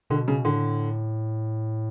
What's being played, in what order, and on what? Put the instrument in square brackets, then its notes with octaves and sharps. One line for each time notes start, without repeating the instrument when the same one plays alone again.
[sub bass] B2 [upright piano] D3
[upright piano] C#3
[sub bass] A2 [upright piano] D3